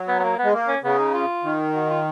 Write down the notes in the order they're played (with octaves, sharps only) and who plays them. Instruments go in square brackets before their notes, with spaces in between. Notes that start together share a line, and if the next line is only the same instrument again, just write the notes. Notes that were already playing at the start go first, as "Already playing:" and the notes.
Already playing: [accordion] F#3
[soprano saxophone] B3
B3
A#3
[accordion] G#3 [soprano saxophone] B3
[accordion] A#3
[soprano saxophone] C#4
[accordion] C#3 [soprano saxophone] B3
[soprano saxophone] D#4
F4
[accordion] D#3
[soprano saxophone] F#4
F4